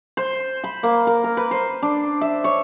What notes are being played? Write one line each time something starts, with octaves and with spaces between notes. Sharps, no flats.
C5
B5
A#3
A#4
A#4
B4
C5
D4
E5
C#5